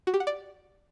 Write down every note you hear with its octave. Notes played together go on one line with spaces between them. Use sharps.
F#4
G4
F#5
D5